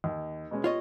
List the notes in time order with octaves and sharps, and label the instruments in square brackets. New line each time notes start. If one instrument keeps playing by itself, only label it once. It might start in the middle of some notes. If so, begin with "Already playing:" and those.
[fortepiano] D#2
B2 G#3 C#4
[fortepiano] B3 G4 [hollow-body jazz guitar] F4 C#5 D#5